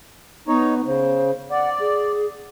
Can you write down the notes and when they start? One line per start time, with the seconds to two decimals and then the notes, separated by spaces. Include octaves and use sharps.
0.48 B3 D#4 C#5
0.86 C#3 C5
1.51 D5 F#5
1.80 G#4